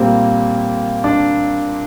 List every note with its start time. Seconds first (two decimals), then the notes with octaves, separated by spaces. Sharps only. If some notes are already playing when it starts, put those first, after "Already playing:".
Already playing: A#2 G3 A#3 C4
1.04 D4